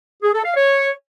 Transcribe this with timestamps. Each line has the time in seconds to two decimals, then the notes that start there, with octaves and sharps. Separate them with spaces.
0.23 G#4
0.34 A4
0.45 F5
0.56 C#5